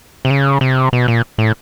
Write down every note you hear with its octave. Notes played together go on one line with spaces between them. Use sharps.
C3
C#3
C3
B2
A#2
A2